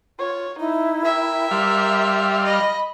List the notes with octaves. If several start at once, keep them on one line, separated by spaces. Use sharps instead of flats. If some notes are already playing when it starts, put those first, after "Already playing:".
F4 C#5
D#4 E4
A#4 E5 G5
G3 F5 C6
D#5 B5